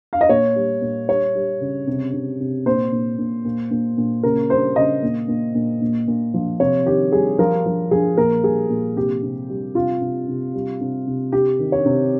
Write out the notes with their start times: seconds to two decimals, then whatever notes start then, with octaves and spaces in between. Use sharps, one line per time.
0.13 F5
0.21 D#5
0.29 A#2 C#5
0.56 G3
0.82 A#2
1.08 G3 C#5
1.35 G3
1.61 C#3
1.87 C3
2.13 C3
2.40 C3
2.66 A#2 C5
2.92 A#2
3.19 A#2
3.45 A#2
3.71 A#2
3.98 A#2
4.23 C#3 A#4
4.50 G3 C5
4.76 C#3 D#5
5.03 A#2
5.28 A#2
5.55 A#2
5.81 A#2
6.08 A#2
6.34 F3
6.60 C3 C#5
6.86 D#3 G4
7.12 G3 G#4
7.38 F3 A#4
7.65 F3
7.91 F3 G#4
8.17 A#2 A#4
8.44 G3 G#4
8.70 A#2
8.96 C3 G4
9.23 C3
9.50 G3
9.75 C3 F4
10.01 C3
10.28 C3
10.54 G3
10.81 C3
11.07 C3
11.32 C3 G4
11.59 D#3
11.72 C#5
11.85 C3